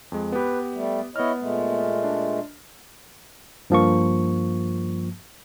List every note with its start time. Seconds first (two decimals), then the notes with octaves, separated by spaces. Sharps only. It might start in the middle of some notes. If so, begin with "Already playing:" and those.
0.12 F2 G#3
0.32 B3 G4 B4
0.74 G3 A3
1.16 B3 E4 C#5 D#5 F6
1.40 A#2 G#3 A3
2.04 D4
3.70 G2 F3 A#3 C#6